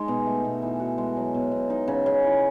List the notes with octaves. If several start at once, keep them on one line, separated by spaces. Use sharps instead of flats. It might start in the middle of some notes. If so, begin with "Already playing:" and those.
Already playing: G#3 D#4
B2
A3
B2
E3
F#4
G#3
F#3
B2
B2
D#4
C#3
C#3
E4